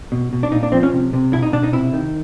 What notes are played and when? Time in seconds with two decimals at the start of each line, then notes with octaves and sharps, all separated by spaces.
0.12 B2
0.33 B2
0.43 D4
0.52 A#2 D#4
0.63 D4
0.72 F3 C4
0.83 C#4
0.93 C3
1.13 C3
1.33 B2 E4
1.42 D#4
1.52 B2 D4
1.63 D#4
1.73 C3 E4
1.93 D#3